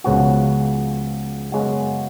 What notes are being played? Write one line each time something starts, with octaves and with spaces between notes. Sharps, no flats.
C#2 C#3 F3 B3 F#4
F#2 C#3 G#3 B3 F#4